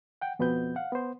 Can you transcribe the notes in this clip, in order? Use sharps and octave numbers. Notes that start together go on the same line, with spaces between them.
F#5 G5
F2 B2 B3 C4 B4 G6
F5 F#5
B3 C5